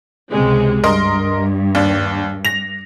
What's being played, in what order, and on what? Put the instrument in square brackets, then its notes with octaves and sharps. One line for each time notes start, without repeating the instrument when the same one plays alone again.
[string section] C#2 C3 G#3
[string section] G2 [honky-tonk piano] A#4 D#5 C6
[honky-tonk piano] D#2 D4
A#6 F7